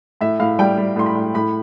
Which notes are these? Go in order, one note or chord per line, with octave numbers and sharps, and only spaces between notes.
A2 E5
A2 F5
G3 G5
G3
A2 C6
B5
A2
A2 B5